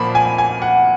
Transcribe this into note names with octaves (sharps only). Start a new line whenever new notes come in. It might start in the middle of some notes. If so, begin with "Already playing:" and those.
Already playing: A#2 F3 A#3 B5
G#5
G#5
F#5